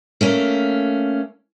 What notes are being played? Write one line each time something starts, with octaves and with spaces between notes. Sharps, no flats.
A3 A#3 C#4